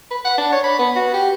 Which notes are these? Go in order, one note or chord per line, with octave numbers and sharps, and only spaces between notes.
B4
F#5
D4
C#5
B5
B3
F#4
G4